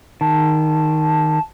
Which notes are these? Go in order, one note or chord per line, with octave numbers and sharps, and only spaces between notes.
D#3 A5